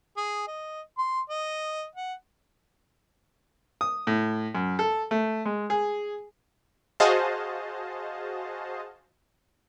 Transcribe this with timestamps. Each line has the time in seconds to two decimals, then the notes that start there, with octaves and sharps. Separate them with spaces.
0.17 G#4
0.47 D#5
0.98 C6
1.30 D#5
1.95 F#5
3.81 D#6
4.07 A2
4.55 F#2
4.79 A4
5.11 A3
5.46 G#3
5.70 G#4
7.00 F#4 G#4 C5 D#5 F5 A5